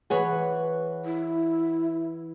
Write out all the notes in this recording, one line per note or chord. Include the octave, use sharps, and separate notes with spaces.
E3 G#4 B4 C#5 F#5
E4